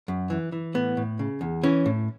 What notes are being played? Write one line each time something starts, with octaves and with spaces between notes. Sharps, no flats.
F#2
E3
E3
A2 B3
A2
C#3
E2
E3 C#4
A2